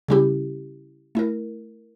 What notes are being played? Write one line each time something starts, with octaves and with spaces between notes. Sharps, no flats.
C#3 G3 C#4 E4 G4
A3 E4 A#4